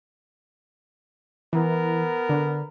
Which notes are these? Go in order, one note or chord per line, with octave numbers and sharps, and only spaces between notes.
E3 B3 A#4
D3